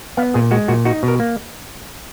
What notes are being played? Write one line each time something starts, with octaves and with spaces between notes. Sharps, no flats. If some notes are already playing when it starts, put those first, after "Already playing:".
B3 F5
A#2 G#4
G#3 F#4
A#2 F#4
D#4 F#4
B2
A#4
A#3